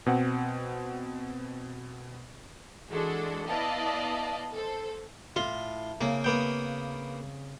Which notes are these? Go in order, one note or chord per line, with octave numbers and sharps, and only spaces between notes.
B2 C4 F#5
E3 G#3 D4 F#4 A4
B3 E4 D5 D#5 F5 A5
A4 C5
A2 F4 C6
C#3 A#3 C4
A#3 B3 G5